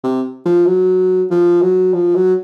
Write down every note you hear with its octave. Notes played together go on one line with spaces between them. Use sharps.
C3
F3
F#3
F3
F#3
F3
F#3